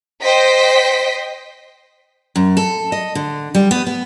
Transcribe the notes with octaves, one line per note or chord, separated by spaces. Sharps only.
C5 D#5 G5 B6
F#2
A4
D#5
D3
G3
B3
B3